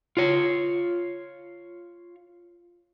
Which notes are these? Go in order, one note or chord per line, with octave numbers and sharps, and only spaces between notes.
F4 C#5